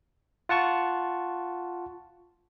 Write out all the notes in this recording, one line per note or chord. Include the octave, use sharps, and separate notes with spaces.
F4 F#5 A5 C#6